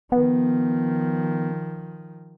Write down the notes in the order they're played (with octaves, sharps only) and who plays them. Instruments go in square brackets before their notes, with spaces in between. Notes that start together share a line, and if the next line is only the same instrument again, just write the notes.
[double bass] D#3 F3 [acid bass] B3